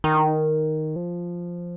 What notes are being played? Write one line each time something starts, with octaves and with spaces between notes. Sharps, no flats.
D#3
F3